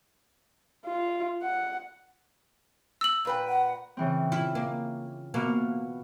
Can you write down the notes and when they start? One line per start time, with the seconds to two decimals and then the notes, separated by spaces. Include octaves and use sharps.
0.86 F4
1.43 F#5
3.01 E6 F#7
3.25 A#2 B4 G5
3.48 F#5
3.97 C#3 E3 C4
4.32 E4 F4
4.55 A#3
5.34 B2 A#3 B3 F5